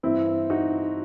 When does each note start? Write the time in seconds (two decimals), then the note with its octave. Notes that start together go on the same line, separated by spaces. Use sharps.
0.03 G2 E3 C4 E4
0.50 D#4 F#4